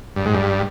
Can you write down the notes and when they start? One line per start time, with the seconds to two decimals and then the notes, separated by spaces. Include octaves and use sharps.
0.16 G2
0.26 G#2
0.34 G2